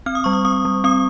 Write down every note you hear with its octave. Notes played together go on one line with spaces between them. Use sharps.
C4 F6
D#6
G3 C#6
D#6
C4 D#6
G3
C4 D#6